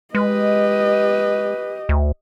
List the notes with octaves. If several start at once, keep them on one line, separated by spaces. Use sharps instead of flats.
G#3 G4 B4 D#5
D2